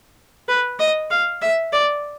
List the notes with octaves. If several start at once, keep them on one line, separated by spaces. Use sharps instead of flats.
B4
D#5
F5
E5
D5